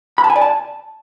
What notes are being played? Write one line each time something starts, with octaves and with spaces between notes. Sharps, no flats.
B5
A5
G#5
D5
A5